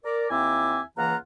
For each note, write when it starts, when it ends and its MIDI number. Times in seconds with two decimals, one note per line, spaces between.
0.04 0.27 70
0.04 0.27 74
0.30 0.80 39
0.30 0.80 60
0.30 0.80 64
0.30 0.80 76
0.30 0.80 80
0.30 0.80 86
0.97 1.15 37
0.97 1.15 52
0.97 1.15 58
0.97 1.15 65
0.97 1.15 78
0.97 1.15 82